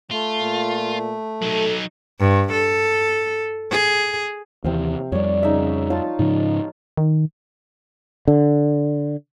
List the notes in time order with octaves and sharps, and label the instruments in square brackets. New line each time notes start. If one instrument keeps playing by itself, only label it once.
[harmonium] A3 [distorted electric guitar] F4
[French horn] A#2
[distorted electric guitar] F#3 D#4 [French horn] A4
[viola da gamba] G2
A4
G#4
[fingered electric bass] D#2 E3 [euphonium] C3 [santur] C4 F5
[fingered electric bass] F2 G3 [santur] C#5 D5
[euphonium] C#3 [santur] D#4 E5
[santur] F4 C#5 A5
[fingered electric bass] G#2 C#3 F3 [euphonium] D#4
[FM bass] D#3
[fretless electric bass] D3